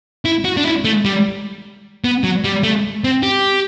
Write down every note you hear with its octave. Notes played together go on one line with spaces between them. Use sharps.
E4
F#4
D4
E4
A3
G3
B3
F#3
G3
A3
C4
G4